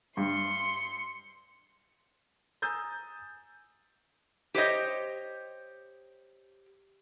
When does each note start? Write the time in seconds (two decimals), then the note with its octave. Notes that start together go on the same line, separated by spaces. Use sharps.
0.17 G2 C6 C#7
2.62 G#5 A#5 D#6 E6 G6 A6
4.54 G4 C5 C#5 D#5